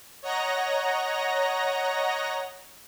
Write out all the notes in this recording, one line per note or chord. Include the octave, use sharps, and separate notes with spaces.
C#5 D#5 F#5 A#5 A#6